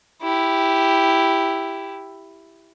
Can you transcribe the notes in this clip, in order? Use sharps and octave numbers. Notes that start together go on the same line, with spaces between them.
E4 G4